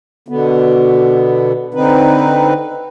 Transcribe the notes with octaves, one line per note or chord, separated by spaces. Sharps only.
B2 D3 B3
D3 C4 D#4 B4